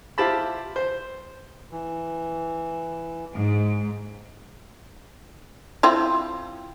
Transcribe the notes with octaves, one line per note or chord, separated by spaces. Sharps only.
E4 F4 G4 C5 A5 B5
C5
E3
G#2
C4 E4 F4